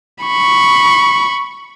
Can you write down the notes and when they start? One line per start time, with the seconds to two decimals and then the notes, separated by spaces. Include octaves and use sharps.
0.23 B5 C#6